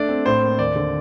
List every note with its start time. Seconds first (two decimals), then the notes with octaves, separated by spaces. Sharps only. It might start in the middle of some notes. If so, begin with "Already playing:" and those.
Already playing: A3 D4 D5
0.09 C4
0.26 A2 C5
0.42 A#3
0.59 D#2 D5
0.76 D3